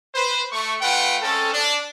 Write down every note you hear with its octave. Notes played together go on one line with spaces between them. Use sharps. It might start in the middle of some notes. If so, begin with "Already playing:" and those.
B4 C5
A3 C#6
A3 F4 B4 F#5 G5
G#3 C4 C#4 A4
D4